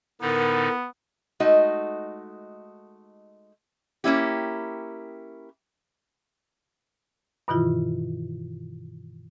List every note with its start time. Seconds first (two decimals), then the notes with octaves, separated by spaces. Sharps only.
0.21 A2 D3 B3 D#4 A#4
1.40 G#3 A3 D#4 F#4 D#5
4.04 A#3 C#4 E4 G4
7.48 G2 B2 D#3 E3 E4 F4